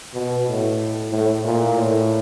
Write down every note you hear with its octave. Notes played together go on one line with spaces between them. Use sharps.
B2
A2
A2
A#2
A2